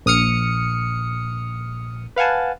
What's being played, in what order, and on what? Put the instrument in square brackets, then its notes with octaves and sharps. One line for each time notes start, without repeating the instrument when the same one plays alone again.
[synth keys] A#1 D#6 F6 C#7
B4 F5 F#5 G#5 A5